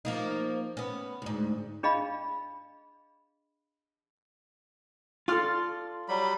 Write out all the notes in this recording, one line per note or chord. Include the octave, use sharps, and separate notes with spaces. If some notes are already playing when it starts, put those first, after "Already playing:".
F3 A#3 D#4
B3 C#4
D2 G#2
D4 G#4 D#5 F5 B5
F4 A4 D5 C6 F6
F#3 G3 B5